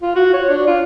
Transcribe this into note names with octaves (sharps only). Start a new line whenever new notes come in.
F4
F#4
C#5
D4
F4